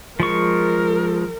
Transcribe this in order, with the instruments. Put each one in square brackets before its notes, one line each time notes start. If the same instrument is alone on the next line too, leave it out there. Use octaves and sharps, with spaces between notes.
[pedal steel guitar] F3 G#3 C#6 [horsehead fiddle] A#4